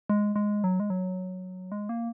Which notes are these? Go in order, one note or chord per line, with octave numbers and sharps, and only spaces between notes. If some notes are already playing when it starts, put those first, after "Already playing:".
G#3
G#3
F#3
G#3
F#3
G#3
A#3